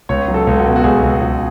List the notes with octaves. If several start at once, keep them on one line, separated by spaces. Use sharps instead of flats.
C#2 C#5
F#3
A4
C#2
F#4
B2
F#4
C#2 G#4
C#2
C#2